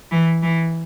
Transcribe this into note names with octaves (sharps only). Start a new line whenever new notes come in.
E3
E3